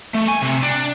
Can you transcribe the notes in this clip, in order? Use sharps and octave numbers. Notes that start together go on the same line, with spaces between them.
A3
G#5
C3
D4